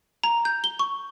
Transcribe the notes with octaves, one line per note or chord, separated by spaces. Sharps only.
A#5
G6
G7
C#6